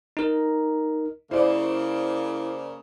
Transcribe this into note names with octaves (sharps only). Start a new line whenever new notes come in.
D#4 A#4
C#3 A#3 E4 C5 D5